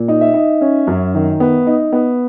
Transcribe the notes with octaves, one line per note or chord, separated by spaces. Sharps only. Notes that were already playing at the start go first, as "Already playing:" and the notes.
Already playing: A#2
D#4
E5
D#4
C#4
F#2
D#3
B3
D#4
B3